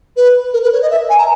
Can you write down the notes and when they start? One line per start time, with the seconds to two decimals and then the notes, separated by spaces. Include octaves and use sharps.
0.16 B4
0.53 A#4
0.63 B4
0.72 C#5
0.81 D#5
0.90 E5
1.09 G#5
1.18 A#5